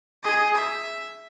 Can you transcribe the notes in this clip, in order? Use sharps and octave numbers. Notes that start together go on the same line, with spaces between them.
G#4 D#5
E5